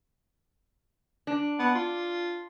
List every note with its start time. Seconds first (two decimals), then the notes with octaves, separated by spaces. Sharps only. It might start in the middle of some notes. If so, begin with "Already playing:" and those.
1.27 D4
1.59 B3
1.74 F4